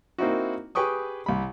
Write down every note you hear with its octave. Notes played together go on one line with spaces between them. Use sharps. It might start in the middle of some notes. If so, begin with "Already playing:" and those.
A#3 C4 D#4 E4 F#4
G4 G#4 B4 G5 C#6 D#6
C2 B5